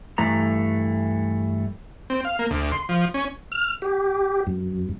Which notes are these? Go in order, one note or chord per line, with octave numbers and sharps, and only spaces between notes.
G2 E3 A3 A#5
C4
F5
A#3
D2
C6
F3
C#4
F6
G4
F#2